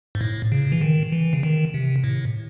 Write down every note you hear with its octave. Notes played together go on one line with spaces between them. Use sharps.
G#2
A2
C#3
E3
D#3
E3
C#3
D#3
C3
A2